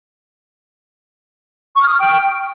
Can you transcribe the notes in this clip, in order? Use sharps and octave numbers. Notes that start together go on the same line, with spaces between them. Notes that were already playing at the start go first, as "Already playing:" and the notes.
C#6
F6
D#6
F6
G5